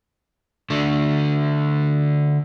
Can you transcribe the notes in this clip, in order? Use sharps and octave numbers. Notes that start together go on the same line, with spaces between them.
D3 A3